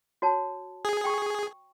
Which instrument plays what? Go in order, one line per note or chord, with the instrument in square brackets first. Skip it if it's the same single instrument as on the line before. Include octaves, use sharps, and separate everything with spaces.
[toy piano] F#4 C#5 A5
[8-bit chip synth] G#4
[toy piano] G5 C#6